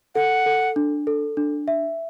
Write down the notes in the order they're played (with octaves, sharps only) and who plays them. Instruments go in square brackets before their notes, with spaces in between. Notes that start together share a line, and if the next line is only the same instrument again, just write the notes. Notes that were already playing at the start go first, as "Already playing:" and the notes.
[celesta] A4 [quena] F#5
[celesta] A4
D4
A4
D4
E5